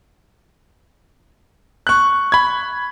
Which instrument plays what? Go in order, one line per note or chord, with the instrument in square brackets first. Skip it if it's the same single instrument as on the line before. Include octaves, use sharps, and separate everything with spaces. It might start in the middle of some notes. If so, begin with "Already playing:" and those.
[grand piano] C#6 F#6
[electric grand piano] B5 G#6